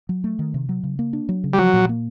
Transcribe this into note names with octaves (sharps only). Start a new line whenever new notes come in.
F#3
A3
D#3
C3
F#3
C#3
A#3
D4
F#3
C#3
G3
F3 F#3
A#2
A#3